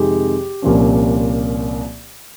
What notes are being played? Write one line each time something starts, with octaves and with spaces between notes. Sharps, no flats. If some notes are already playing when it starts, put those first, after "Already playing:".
Already playing: F2 C3 D#3 G#3 G4
C2 A#2 F3 A#3 C#4